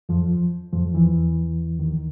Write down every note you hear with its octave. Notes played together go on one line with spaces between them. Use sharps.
F2 F3
F2 F3
E2 E3
D#2 D#3